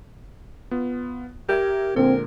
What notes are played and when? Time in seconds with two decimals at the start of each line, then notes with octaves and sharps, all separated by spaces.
0.71 B3 F4
1.49 G4 A#4 E5 G#6
1.96 A#2 D3 G#3 C4 A#4